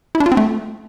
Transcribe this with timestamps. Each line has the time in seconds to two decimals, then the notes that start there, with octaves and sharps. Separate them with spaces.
0.15 E4
0.20 D4
0.26 F4
0.32 C4
0.37 A3